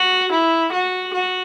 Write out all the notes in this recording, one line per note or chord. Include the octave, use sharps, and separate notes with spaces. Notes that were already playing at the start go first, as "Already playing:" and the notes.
Already playing: F#4
E4
F#4
F#4